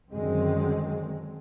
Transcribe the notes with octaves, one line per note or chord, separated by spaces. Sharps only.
F#2 D3 D#3 G#3 C4